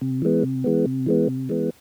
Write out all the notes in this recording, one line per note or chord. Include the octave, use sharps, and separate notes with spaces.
C3
E3 G#3 B3
C3
E3 G#3 B3
C3
E3 G#3 B3
C3
E3 G#3 B3